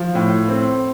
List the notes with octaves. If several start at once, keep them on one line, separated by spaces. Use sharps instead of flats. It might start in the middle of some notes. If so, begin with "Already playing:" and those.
Already playing: F3
A2
C4